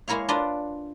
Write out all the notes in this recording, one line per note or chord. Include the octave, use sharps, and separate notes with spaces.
G#3 A#3 E4 A#4 C#5 F5
D4 F4 B4 D5 A#5 C6